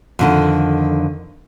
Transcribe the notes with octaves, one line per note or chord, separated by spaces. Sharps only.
F2 D3 D#3